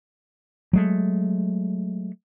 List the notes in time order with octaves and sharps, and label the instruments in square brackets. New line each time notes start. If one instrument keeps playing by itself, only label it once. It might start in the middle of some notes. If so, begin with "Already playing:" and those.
[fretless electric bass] F#3 G#3 A3